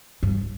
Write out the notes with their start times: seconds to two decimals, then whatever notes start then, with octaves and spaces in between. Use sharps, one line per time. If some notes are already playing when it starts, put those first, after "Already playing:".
0.23 G2